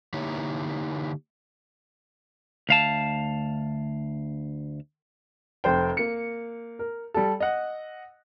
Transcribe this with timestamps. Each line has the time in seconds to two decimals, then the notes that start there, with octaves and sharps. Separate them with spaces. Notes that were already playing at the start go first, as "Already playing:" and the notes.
0.14 D3 A#3 D#4 E4 G4 C#5
2.69 D2 F5 A5
5.64 F1 C5 G5
5.97 A#3 C#7
6.79 A#4
7.14 G3 A4
7.40 D#5 F#5